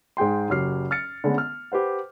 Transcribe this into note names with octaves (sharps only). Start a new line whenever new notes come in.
G#2 G#4 G5 C6
F#1 F#3 G4 F6 C7
F6 A6 C#7
D3 G#3 A3 B3 C#4
F6
G4 B4 C5 F#5